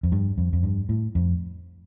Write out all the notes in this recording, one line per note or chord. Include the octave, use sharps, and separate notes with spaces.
F2
G2
F2
F2
G2
A2
F2